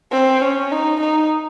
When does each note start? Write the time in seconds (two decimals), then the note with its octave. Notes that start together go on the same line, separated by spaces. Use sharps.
0.12 C4
0.42 C#4
0.72 D#4
1.00 D#4